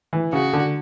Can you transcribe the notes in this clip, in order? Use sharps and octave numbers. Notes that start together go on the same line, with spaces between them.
E3
C#3 F#4
D3